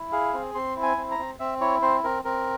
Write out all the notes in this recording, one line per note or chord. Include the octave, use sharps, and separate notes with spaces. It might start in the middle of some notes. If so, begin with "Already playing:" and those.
Already playing: E4
G#4 F5
C4
C4 C6
E4
G#5
C4
A#5
C4
C4 E5
E4 C#5
C4 C5
C4 A#4
C4 A#4